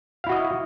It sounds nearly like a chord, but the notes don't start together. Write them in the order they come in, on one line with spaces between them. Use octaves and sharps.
F5 E4 F#4 D#5